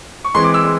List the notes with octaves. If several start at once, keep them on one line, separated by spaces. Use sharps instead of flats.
C#6
E3 G#3 C4 C6
D6
E6
G#3